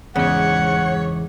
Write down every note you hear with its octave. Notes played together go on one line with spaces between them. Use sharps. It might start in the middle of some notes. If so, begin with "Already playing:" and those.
E2 G#2 C#3 C#5 F#5